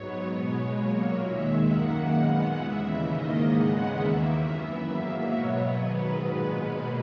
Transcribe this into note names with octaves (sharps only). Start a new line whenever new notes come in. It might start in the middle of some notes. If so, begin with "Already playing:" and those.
Already playing: G#2 F#3 B3 C#5
B2 G#3 B3
A#2 F#3 A#3 C#5
D#2 D#3 G#3 E5
F#2 D#3 A#3 F#5
A#2 G#3 B3 F#5
D#2 C#3 E3 E5
G#2 D#3 A#3 D#5
E2 C#3 G#3 B3 F#5
D#2 D#3 A#3 E5
F#2 E3 B3
G#2 F#3 A#3
B2 F#3 B3 C#5
G#2 D#3 F#3 B3 B4
A#2 G#3 B3
B2 F#3 A#3